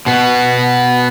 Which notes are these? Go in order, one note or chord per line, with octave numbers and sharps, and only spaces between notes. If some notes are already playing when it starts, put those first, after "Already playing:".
B2 B3